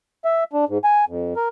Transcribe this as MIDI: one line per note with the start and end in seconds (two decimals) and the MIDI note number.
0.25 0.44 76
0.53 0.65 62
0.69 0.78 44
0.84 1.05 80
1.08 1.34 41
1.36 1.48 70